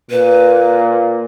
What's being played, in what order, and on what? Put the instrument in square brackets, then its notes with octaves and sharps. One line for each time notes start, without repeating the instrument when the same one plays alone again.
[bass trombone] A#2 [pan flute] B4